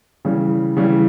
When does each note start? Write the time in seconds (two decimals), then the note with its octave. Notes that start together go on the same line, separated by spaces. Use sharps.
0.25 C#3 E3 G3
0.77 C#3 E3 G3